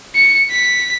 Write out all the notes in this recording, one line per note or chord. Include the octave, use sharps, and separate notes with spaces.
C#7
B6